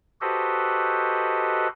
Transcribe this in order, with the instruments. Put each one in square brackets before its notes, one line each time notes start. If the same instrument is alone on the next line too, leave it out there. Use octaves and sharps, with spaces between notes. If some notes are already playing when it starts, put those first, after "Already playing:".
[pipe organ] F#4 G4 A4 B4 C5 D#5